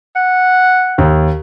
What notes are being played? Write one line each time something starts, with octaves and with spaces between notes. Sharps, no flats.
F#5
D#2